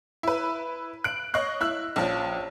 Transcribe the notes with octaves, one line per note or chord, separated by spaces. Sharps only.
E4 B4
F#6 D7
C#5 D#5 C#6 F#6 C7
E4 E6 F#6
A#1 F3 C#4